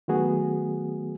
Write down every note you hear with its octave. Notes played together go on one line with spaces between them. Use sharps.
D#3 F#3 A3 B3 F#4 G#4